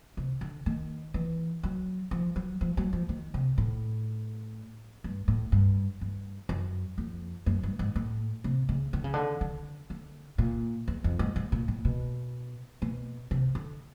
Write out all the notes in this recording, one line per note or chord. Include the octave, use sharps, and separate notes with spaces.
C3
D3
D#3
E3
F#3
F3
F#3
F3
F#3
F3
D#3
C3
A2
G2
A2
G2
G2
F#2
F2
F#2
G2
G#2
A2
C3
C#3
D3
C#3
D3
D3
D3
A#2
E2
F2
G#2
G#2
A#2
A2
B2
B2
C3
D3